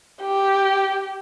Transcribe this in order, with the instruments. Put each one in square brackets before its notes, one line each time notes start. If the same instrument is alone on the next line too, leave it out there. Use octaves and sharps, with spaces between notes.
[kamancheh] G4